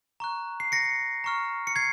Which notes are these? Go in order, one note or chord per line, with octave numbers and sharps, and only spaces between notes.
A#5 C#6 F#6
C7
A#6 C#7
A#5 C#6 F6
C#7
G#6 C7